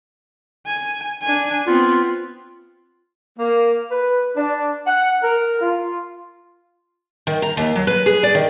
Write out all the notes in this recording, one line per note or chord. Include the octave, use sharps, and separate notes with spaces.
G#5
D4 G#5
B3 C4 F4
A#3
B4
D4
F#5
A#4
F4
D#3
A#5
D#2
F#3
B4
G#4
D5
D#3